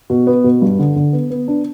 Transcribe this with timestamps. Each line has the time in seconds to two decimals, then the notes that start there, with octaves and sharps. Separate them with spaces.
0.10 B2
0.27 B3
0.44 B2
0.62 G2
0.79 D3
0.96 D3
1.13 B3
1.30 B3
1.48 D4